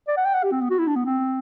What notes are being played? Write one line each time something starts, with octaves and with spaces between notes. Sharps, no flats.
D5
F#5
G5
F#5
G4
C4
B3
F#4
E4
D4
B3
C4